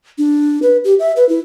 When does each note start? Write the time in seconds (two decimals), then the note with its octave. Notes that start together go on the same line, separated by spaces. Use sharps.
0.18 D4
0.62 B4
0.84 G4
0.99 E5
1.16 B4
1.29 E4